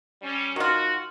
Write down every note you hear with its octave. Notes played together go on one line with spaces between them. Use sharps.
G3 C#4
D#3 F4 F#4